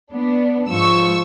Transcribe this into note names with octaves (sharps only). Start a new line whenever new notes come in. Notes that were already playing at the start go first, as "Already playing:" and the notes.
B3 D4
G#2 F3 C#6 E6